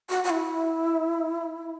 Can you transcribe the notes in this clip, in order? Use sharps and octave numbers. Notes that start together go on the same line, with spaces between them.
F#4
F#4
E4